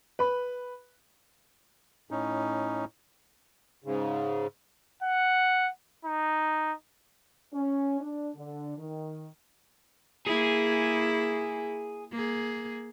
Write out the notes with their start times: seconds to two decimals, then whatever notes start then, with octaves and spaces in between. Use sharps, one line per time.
0.19 B4 B5
2.11 A2 C#4 D#4
3.84 G#2 C#3
5.03 F#5
6.05 D#4
7.54 C#4
8.00 D4
8.35 D3
8.77 D#3
10.26 A#3 E4 G#4
12.12 A#3 G#4